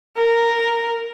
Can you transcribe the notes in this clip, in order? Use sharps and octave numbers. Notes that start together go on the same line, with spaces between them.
A#4